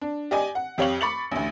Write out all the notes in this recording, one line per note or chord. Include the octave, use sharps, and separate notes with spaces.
D4
G4 D5 D#5 G#5
F#5
F2 G4 C#5 F5 F#7
B5 C#6 D6 A6 C#7 F#7
A1 D2